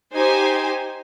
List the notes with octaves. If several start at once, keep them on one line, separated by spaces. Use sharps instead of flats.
D#4 G4 C5 G#5